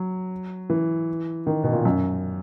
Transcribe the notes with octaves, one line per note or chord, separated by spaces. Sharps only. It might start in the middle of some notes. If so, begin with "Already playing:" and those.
Already playing: F#3
E3
D#3
B2
A#2
F#2